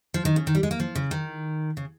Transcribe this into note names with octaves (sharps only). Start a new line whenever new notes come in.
F3
D#3
C#3
D#3
G3
G#3
A#3
F3
C#3
D#3
C#3